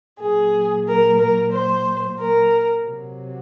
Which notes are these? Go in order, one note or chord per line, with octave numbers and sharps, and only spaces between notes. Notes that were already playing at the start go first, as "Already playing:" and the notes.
A#2 F#3 G#4
A#4
A#4
C5
A#4
C3 F#3